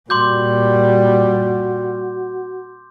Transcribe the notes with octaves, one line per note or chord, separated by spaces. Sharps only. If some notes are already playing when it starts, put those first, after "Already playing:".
A#2 G3 F#4 C6 D6 G6